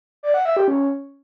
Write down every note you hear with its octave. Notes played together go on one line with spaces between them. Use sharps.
D5
F#5
E5
G4
C#4